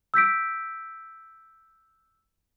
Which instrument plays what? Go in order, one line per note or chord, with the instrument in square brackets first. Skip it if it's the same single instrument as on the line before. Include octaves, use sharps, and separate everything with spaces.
[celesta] E6 G6 B6 D7